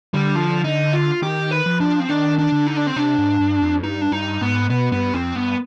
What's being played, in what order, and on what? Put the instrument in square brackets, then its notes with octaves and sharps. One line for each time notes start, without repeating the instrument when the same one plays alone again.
[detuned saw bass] D3 [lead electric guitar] G3
[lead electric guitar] F3
D#4
F4
[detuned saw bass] D#3 [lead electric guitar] G4
[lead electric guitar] B4
[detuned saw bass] F3
[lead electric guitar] D4
C4
[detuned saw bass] D#3 [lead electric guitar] D4
[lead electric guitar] D4
[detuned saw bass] D3
[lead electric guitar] D#4
D4
C4
[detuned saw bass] C3 [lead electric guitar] D4
[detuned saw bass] G#2
G2
F2
[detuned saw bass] G2 [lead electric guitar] D#4
[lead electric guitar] D4
[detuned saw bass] G2 [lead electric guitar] D#4
[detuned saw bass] G#2 [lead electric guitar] B3
[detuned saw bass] B2 [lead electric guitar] B3
[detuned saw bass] G2 [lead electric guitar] B3
[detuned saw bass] F2 [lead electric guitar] C4
[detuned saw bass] G2 [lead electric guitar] B3